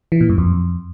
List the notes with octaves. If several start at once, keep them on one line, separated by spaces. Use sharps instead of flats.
E3
A#2
F#2
F2